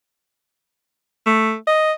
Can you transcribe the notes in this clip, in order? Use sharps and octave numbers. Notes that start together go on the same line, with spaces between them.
A3
D#5